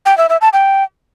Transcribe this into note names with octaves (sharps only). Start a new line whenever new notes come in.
G5
E5
E5
A5
G5